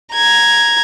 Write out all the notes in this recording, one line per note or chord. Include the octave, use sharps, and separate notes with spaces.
A#5 G#6